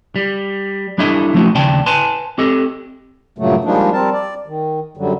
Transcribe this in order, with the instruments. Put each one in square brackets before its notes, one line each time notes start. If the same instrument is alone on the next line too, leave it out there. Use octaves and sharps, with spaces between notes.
[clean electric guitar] G3
G3 D4 E4 A4 D#5
F3 A3 C#4 D#4 F#4
D#2 C#3 D5 G5 A5
B4 G#5 A5 C6
C4 G4 A4 D#5
[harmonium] G2 A#2 C#3 F#3 A3
F3 G3 G#3 A#3 D4 D#4
G3 C4 A#4 A5
D5
D#3
F#2 D3 F#3 G3